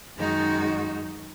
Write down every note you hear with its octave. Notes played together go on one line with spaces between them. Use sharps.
F#2 D#3 G#3 D#4 F#4